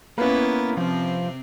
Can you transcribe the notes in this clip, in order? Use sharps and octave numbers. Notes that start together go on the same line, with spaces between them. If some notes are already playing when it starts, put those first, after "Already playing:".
A#3 B3 C#4 E4 B4
C3 F3 C4